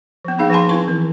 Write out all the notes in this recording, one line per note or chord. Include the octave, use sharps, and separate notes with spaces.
F3 B3
A#3 D#4 G#4 F5
F3 B4 G#5 A5 C6
C4 E4 C#6
E3